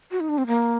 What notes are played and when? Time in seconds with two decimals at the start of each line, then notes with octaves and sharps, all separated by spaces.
0.11 F#4
0.20 D#4
0.29 D4
0.38 C4
0.47 A#3